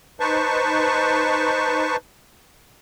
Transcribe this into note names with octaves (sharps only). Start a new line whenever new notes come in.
D#4 B4 C5 A5 C#6